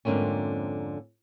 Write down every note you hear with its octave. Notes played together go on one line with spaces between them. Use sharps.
F2 G#2 D3 A#3 C4 C#4